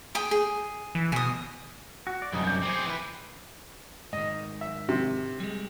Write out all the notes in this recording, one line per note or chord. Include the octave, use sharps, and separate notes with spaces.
G#4 G5 D6
G#4
E3
B2 G#5 D#6
F#4
D5
C2 F#2 G3 D#4
D6 G6
C4 G#4
E3 B4
G#2 D#3 D#5
E5
C3
G3 G#3